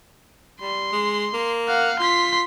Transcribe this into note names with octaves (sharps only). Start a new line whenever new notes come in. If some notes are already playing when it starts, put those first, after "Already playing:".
G3 C6
G#3
A#3
F5 F#5
F4 C6 B6